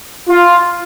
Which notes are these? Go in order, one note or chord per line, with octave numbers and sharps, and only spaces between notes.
F4